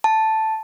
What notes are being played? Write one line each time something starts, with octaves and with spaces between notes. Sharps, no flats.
A5